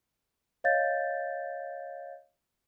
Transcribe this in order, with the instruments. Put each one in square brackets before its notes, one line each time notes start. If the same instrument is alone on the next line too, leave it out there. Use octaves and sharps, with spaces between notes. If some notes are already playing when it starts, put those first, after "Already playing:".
[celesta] C#5 D#5 F5 G6 A6